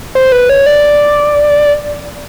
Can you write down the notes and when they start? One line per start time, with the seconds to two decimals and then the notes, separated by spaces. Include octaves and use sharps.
0.15 C5
0.32 B4
0.49 C#5
0.66 D5